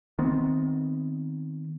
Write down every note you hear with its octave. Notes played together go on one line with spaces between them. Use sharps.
D#3 B3 C4